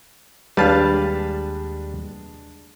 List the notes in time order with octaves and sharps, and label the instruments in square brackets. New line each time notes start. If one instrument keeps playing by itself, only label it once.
[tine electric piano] D#2 [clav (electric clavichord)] G3 [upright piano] G#3 D4 [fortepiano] B4 F5 A5